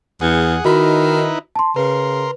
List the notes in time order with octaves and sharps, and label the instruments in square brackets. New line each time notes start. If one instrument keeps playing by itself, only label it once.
[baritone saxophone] E2 [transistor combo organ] G#4 F#5
[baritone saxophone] D#3 [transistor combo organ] D#4 E4 B4 [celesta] F#4
[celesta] A5 C6
[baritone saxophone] C#3 [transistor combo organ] A#4 C6 [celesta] B4